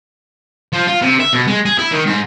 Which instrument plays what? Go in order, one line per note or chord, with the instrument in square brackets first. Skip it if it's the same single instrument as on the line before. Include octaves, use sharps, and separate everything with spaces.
[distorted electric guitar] F3
F4
C3
E5
B2
G#3
G#4
E4
D#3
G#2